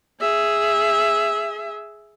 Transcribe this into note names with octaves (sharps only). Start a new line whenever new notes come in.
G#4 E5